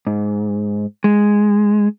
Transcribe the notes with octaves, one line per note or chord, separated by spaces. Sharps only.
G#2
G#3